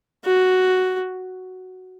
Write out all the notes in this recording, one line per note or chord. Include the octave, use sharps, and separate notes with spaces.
F#4